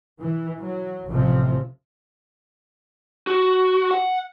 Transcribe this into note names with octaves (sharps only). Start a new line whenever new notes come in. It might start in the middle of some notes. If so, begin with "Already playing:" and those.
E3
F#3
A1 C3 F3
F#4
F#5